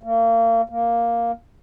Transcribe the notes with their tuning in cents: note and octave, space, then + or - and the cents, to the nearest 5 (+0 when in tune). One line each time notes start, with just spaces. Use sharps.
A#3 -35
A#3 +0